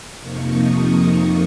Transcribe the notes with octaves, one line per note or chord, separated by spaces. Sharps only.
F2 C3 F3 A#3 D#4 C#6
D#6
C#6